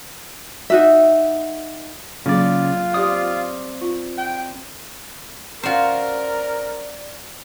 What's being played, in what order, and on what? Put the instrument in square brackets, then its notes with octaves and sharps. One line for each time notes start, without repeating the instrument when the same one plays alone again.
[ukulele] D#4 F#4 E5
[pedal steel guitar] C#3 D5 [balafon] F#3 A#3 G#4 [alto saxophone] F4
[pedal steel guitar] C4 D5 D#6 [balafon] G4 F5
[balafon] F4
[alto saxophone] G5
[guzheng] C#4 F4 [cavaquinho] F#4 C5 [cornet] A#4 [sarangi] D5